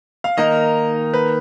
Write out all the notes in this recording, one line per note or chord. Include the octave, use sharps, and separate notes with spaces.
F5
D#3 A#3 D#4 A#4 D#5
B4